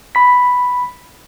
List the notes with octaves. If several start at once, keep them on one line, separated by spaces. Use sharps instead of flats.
B5 B6